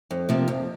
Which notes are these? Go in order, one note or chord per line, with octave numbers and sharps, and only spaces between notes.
F2
C3 F3 A#3
F2